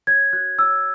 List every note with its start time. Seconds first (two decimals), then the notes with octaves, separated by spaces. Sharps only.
0.07 C#5 G#6
0.33 F#4 F#6
0.59 C#5 E6